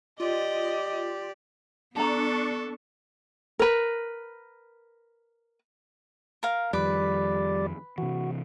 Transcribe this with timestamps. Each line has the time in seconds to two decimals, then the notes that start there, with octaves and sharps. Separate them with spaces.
0.20 F4 G4 D5 D#5
1.96 B3 D4 A4 A5 A#5 C#6
3.59 A#4 B4
6.43 A#4 F5
6.73 F2 D#3 G3 B4 D5 D6
7.98 C3 E3 F#4